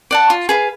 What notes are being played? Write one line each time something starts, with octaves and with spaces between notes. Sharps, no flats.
D5 F#5 A5
F4
G#4 B4 F5